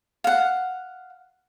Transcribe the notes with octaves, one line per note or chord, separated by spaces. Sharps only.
F5 F#5